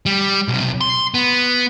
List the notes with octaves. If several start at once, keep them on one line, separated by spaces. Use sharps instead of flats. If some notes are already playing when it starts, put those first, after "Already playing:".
G3
B1 C3
C6
B3